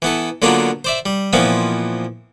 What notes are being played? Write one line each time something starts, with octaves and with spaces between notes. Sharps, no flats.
E3 B3 A4
D3 F#3 A#3 B3 D4 F4
C5 D5 E5
G3
A#2 E3 F3 B3 C4